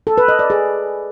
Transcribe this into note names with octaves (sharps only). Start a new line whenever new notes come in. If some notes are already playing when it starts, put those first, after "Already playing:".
A4
B4
D#5
D5
G#4